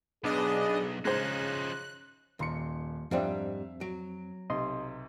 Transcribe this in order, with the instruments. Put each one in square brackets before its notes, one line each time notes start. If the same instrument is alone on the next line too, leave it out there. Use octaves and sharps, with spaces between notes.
[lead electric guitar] B1 [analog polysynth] B3 D4 D#5 [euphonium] G#4
[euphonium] C#3 [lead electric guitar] F3 D#4 [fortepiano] G#3 G#4 C5 [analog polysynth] F#6
[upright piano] D#1 C6 C#7 [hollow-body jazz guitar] D#2
[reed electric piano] F2 C4 [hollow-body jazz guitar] G#2 G3 D4 [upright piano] E5 F5
[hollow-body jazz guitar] F#3 [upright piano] D7
[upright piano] B1 C3 [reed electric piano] D#5 C6